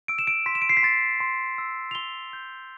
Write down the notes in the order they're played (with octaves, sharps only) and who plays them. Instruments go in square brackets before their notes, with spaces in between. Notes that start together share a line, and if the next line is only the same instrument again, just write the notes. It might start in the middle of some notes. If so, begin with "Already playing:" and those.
[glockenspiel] E6 D7
E7
D7
C6 B6
E7
D7
C7
B6
C6 A6
C6
E6
F7
C6 G7
G6